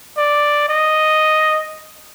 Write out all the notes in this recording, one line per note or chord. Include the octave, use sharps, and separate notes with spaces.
D5
D#5